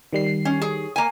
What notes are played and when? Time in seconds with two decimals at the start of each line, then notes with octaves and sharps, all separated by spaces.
0.13 D#3 G3 C7
0.45 C#4
0.62 G#4
0.96 A#3 G#5